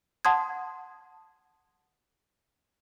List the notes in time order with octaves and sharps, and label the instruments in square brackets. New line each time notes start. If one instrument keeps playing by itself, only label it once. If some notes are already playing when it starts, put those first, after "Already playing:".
[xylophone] F#5 A5 C6 D#6 G#6